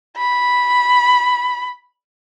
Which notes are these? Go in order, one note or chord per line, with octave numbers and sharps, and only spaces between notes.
B5